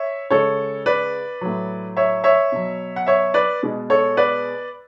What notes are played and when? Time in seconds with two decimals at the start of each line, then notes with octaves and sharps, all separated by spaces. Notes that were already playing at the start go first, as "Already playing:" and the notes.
Already playing: C#5 E5
0.30 C#3 G#3 A4 C#5
0.86 B4 D5
1.41 A2 F#3
1.97 C#5 E5
2.24 C#5 E5
2.52 B2 F#3
2.96 F#5
3.07 C#5 E5
3.34 B4 D5
3.63 B2 G#3
3.90 A4 C#5
4.17 B4 D5